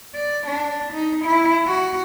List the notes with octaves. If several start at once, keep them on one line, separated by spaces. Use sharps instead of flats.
D5
D4
D#4
E4
F#4